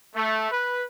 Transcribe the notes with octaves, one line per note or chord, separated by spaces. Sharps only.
A3
B4